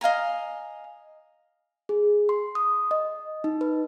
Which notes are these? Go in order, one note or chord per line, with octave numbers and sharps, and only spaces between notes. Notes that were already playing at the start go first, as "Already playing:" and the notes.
D#5 F5 G#5 A#5
G#4
C6
D#6
D#5
D#4
B4